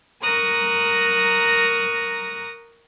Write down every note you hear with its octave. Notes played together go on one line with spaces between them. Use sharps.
A#4 A#5 C#6 D#6 F#6